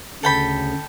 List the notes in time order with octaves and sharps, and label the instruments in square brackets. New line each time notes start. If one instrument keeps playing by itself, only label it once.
[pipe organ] D2 C#3 [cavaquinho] A4 G5 B5